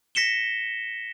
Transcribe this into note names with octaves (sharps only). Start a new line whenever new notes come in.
A#6 B6 C#7 E7 G7